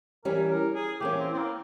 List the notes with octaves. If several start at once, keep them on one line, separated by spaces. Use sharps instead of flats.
E3 G3 C#4 A#4
A#4
G#4
E3 A#3 C#4 G4
C4
C4
A#3